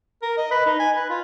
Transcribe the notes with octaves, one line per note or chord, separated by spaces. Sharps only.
A#4
D#5
B4
D#4
G#5
B4
F4